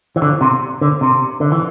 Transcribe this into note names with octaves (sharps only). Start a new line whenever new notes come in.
E3
D3
C3
D3
C3
D3
E3